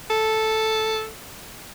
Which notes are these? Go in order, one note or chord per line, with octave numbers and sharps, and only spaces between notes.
A4